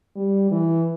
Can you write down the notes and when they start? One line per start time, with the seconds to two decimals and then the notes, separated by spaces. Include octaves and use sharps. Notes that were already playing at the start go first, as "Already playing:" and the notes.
0.16 G3
0.51 E3